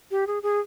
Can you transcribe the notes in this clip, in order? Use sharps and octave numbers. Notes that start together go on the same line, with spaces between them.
G4
G#4
G#4